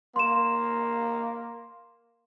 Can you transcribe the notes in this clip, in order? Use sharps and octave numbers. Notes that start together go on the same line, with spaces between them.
A#3 C6 E7